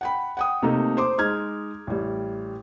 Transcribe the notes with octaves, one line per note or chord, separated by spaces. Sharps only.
F#5 G5 B5
F#5 G5 D#6
C3 A3 A#3 D#4 A4
C5 C6 D6
G#3 D#4 F6 G#6
A1 G3